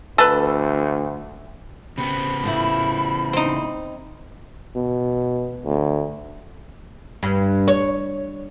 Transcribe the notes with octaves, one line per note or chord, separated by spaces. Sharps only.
D2 A4 B4
C#3 B3 C4 B5
A2 F3 E4
C4 D#4
B2
D2
G2
C#5